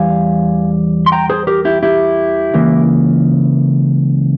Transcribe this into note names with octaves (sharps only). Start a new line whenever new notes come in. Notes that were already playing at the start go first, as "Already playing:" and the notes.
Already playing: E2 E3 G3 F5 G#5
C6
G5 A#5
G#4 C5
G4 A#4
E4 G4
E4 G4
C#2 C#3 E3 A#3